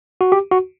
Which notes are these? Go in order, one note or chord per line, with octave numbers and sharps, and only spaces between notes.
F#4
G4
F#4